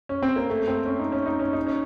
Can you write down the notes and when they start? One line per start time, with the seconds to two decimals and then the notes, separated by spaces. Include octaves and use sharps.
0.09 C#4
0.23 C4
0.36 A#3
0.50 A3
0.68 C4
0.85 C#4
0.99 D#4
1.12 C#4
1.26 D#4
1.40 C#4
1.53 D#4
1.67 C#4